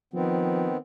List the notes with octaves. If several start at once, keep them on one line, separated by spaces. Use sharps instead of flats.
D#3 F3 B3 C4